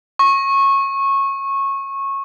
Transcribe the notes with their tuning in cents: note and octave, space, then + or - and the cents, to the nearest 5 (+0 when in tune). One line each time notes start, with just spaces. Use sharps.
C#6 -20